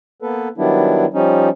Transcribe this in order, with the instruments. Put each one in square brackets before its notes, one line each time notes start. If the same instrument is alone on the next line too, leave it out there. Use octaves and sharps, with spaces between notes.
[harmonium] A#3 B3 A4 B4
D#3 F#3 G3 B3 D4 E4
F3 G3 C#4 D#4